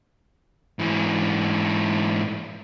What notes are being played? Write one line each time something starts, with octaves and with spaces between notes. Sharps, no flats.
G#2 E3